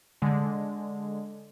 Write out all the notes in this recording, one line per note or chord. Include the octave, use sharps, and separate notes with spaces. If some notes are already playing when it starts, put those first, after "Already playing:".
D3 G#3